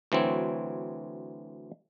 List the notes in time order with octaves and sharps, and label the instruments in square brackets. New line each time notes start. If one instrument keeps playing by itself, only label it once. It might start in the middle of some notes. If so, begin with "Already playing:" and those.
[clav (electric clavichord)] D2 E3 F#3 C4